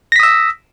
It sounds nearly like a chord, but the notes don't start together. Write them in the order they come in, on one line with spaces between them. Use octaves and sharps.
A#6 B6 D#6 E6